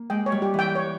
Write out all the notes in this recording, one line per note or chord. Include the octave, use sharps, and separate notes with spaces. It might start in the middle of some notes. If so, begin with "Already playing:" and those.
Already playing: A#3
G#3 G5
C#5
G3
G4
E3 G5
C#5